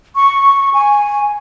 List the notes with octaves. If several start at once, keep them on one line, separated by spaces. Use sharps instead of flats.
C#6
G#5